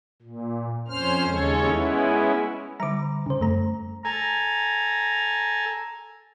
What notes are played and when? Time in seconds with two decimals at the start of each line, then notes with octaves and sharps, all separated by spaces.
0.22 A#2
0.88 F2 C#4 C5 F6
1.28 D#2 C#3 G#3 C#4 A4 C#5
1.70 G#3 B3 C#4 E4
2.80 D3 G3 A#5 D6
3.26 C#3 C5
3.40 F#2 A3 A#5
4.05 A4 G#5 A#5